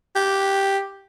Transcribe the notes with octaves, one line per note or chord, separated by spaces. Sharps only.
G4